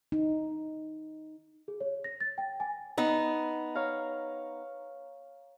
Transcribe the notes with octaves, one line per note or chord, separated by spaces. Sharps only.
D#4
G#4
C#5
A#6
A6
G5
G#5
B3 D#4
C#5 F5 A#5